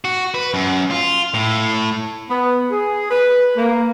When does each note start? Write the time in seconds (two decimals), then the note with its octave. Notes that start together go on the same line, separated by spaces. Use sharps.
0.05 F#4
0.34 B4
0.54 F#2
0.91 F4
1.34 A2
2.30 B3
2.71 G#4
3.11 B4
3.57 A#3